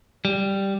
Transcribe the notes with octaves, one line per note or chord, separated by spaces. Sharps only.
G3